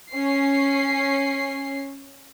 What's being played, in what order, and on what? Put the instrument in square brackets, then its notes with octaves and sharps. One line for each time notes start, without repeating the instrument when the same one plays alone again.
[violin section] C#4 C7